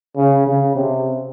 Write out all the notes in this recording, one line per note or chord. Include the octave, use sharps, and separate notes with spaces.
C#3
C#3
C3